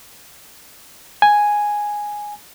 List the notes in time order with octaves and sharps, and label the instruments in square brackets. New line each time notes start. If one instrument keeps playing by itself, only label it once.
[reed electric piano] G#5